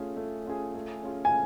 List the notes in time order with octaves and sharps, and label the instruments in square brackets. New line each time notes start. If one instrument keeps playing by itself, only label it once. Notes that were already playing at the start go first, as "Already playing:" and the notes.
Already playing: [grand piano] A3 C#4 F4 G#4
A3
C#4 F4 G#4
A3
C#4 F4 G#4
[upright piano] G#5